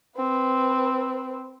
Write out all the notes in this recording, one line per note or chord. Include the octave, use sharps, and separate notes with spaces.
C4 B4